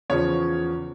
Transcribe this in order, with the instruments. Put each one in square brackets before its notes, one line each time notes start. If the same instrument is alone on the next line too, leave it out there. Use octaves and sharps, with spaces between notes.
[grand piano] E2 C#3 F3 C#5